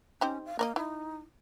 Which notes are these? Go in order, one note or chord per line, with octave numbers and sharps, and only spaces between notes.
C4 C#4 D#4 G4
F5
A#3 A#4 D5 D#5
D#4 E4